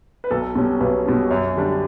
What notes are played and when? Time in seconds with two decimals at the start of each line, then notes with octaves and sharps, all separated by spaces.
0.24 B4
0.31 B1 A4
0.55 B2 G3 C#4
0.80 B1 B4
1.06 B2 G3 C#4
1.30 F#2 C#5
1.55 D3 G3 D4